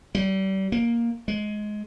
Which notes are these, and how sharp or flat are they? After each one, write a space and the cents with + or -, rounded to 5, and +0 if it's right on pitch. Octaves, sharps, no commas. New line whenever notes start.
G3 -35
A#3 +5
G#3 +15